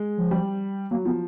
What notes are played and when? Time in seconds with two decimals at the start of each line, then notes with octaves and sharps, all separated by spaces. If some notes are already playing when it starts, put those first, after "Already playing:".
Already playing: G#3
0.17 F3
0.31 G3
0.91 F#3 A#3
1.05 F3 B3